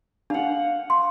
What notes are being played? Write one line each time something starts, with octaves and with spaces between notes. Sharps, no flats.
D4 F5 F#5
C6